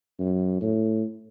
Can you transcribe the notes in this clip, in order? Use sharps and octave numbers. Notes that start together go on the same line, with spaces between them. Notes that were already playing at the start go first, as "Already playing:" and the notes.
F#2
A2